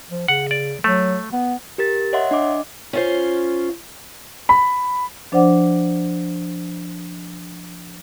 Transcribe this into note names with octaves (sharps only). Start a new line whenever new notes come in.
F3
C#3 F#5
D5
F#3 A3
B3
G4 A#4 A6
C#5 D#5 E5 F#5 C6
D4 D#5 D6
C#4 F4 C5
B5
F3 D4 C5 D5 F#5 D6